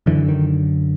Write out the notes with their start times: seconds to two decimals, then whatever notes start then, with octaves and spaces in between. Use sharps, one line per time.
0.06 F#2 D3 E3
0.28 D#3